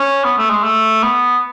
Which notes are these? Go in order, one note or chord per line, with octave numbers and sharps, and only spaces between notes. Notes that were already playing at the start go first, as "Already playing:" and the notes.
Already playing: C#4
B3
A3
G#3
A3
B3